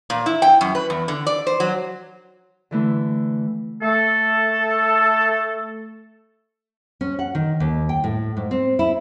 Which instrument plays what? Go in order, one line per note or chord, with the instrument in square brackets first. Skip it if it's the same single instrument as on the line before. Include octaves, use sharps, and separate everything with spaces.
[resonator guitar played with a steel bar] A#2
E4
G5
F#2
B4
E2
D3
D5
C5
F#3
[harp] D3 E3 A3
[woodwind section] A3 A4
[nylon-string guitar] C#4
F#5
D#3
D#2
G5
A2
G#2
C4
E4